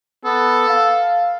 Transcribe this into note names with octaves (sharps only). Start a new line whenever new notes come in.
B3 A4
F5